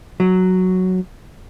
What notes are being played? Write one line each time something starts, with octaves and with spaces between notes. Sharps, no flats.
F#3